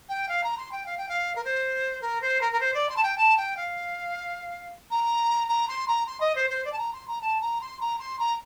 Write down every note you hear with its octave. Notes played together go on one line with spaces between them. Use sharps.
G5
F5
A#5
C6
G5
F5
G5
F5
A#4
C5
A#4
C5
A#4
A#4
C5
D5
C6
A5
G5
A5
G5
F5
A#5
A#5
C6
A#5
C6
D#5
C5
C5
D5
A5
A#5
C6
A#5
A5
A#5
C6
A#5
C6
A#5